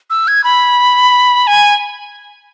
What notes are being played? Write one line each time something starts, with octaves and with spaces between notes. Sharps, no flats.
E6
G#6
B5
G#5